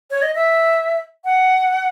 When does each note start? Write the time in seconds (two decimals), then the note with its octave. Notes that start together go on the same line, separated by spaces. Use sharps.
0.11 C#5
0.22 D#5
0.35 E5
1.25 F#5